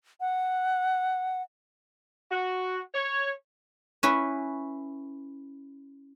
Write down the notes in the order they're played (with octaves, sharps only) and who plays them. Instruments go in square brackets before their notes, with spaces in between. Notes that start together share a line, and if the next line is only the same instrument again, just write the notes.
[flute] F#5
[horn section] F#4
C#5
[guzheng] C#4 E4 B4